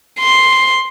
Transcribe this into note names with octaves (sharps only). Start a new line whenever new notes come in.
C6